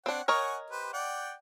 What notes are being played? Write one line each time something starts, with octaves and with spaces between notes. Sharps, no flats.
C4 D4 C#5 F#5
A#4 C#5 D#5 F#5 G#5 C#6
G4 B4 C5
D5 F#5 G5